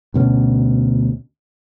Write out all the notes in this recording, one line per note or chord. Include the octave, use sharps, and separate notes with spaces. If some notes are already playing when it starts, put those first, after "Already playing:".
D2 B2 G3 C#4